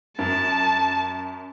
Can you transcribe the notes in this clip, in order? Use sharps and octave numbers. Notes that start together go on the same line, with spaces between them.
F#2 A5